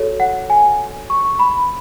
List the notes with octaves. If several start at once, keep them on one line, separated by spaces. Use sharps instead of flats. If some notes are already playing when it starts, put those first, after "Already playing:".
Already playing: F#4 A4 C#5
F#5
G#5
C#6
B5